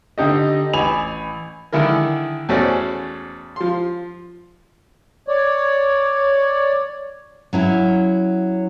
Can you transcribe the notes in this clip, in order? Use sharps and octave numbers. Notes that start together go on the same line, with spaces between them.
D3 D#4 G4 D#5
A1 G#5 B5 F7
D3 D#3 G#3 E4 A#4
E2 A3 C#4 F#4 C5 D5
F3 C6
C#5 D5
F#3 C#4 E4